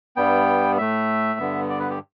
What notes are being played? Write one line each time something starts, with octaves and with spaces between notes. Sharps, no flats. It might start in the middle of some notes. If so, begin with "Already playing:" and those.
G2 G3 B3 G5
A2 A3 E5
G2 D3 B3
D5
B4
G4